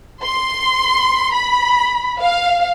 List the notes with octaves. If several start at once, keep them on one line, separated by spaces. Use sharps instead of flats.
C6
B5
F5